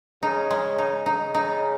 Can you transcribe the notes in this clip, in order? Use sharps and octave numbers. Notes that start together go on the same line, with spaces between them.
C#3 D#4
G#3
D#4
C#3 D#4
D#4